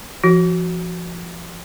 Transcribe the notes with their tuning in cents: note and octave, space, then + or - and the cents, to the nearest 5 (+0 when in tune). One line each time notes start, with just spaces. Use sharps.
F3 -30 F#4 +0